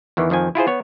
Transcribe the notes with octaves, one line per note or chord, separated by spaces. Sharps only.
E2 D#3 E3
F2 D#3 F3 G#5
E4 F4 G#4 C5
B3 C#5